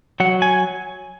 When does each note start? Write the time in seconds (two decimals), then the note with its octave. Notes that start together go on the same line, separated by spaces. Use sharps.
0.20 F#3 F#5
0.42 G#5